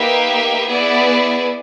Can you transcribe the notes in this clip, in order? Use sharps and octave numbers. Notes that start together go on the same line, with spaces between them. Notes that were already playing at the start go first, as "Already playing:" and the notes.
Already playing: A#3 D#4 G4 B4 E5
B3 E4 G#4 B4 D5